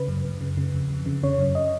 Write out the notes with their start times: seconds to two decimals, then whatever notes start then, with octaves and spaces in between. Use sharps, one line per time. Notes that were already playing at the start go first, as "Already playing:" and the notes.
Already playing: C#3 B4
0.08 F#2
0.25 F#2
0.41 C#3
0.57 C#3
0.75 F2
0.90 F2
1.06 C#3
1.23 C#3 C#5
1.39 F#2
1.55 D#5